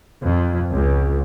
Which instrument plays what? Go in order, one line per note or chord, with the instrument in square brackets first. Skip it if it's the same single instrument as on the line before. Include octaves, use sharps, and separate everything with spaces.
[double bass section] F2
C#2